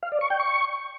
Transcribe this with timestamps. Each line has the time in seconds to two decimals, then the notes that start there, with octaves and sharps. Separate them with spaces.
0.03 F5
0.12 D5
0.21 C#6
0.30 G5
0.40 C#6